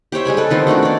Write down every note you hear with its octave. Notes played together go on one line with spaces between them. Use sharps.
G4 C5 C#5 E5
G3 G#3 G#5 B5
A4 B4
D#3 F3 B3 C4
D#3 A3 D4 F#4
C#5 D5